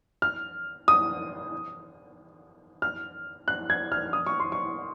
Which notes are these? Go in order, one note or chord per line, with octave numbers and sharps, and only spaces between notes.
F6
D#6
F6
F#6
G#6
F6
D#6
C#6
C6
C#6